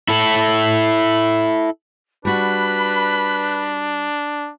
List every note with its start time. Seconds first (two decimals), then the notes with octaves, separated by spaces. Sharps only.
0.08 E4 A4
2.25 G3 D4 F#4 B4 B5